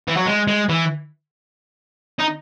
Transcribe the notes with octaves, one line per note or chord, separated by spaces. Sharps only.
E3
F#3
G#3
G#3
E3
D#4